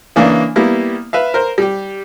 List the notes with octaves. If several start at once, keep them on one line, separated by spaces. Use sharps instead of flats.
C#3 E3 A#3 D4
G3 A#3 B3 E4
B4 E5 F5
A#4 C5
G3 G4